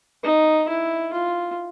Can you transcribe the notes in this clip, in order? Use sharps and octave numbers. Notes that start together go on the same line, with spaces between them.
D#4
E4
F4